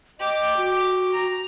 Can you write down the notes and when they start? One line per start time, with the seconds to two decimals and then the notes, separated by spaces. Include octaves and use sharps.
0.19 G4 D#5 D6
0.57 F#4
1.13 A#5